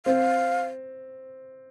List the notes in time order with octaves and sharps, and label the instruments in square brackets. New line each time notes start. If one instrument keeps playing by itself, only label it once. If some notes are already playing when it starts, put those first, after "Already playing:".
[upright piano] C4 [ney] F5